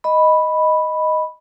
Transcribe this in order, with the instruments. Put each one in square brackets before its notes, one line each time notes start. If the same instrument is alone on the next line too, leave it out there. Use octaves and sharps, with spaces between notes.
[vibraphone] D#5 B5